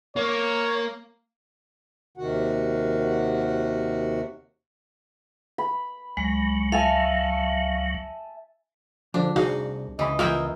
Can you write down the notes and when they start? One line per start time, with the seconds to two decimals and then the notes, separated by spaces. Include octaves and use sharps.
0.16 A#3 C#5
2.17 D#2 C3 D#3 F#4 F#5
5.58 B5
6.17 C#2 F#3 G#3
6.72 E5 F5 G#5 A5
9.14 D3 F3 D4
9.36 C2 D#4 F#4 G#4 F5
9.99 C#2 E3 D#5 B5
10.19 E3 A#3 E4 F4 G5